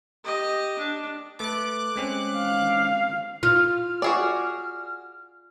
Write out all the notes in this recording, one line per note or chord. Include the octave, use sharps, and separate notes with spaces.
G4 D#5
D4
A3 B4 A5 D6 F#6
G#3 C4 C#4
F5
F4 F6
F#4 G#4 D5